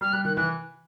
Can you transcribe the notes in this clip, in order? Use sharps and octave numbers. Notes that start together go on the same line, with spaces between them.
G3 F6
G3 F#6
D#3 F#6
E3 F#6